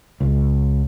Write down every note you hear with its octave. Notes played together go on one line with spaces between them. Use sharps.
C#2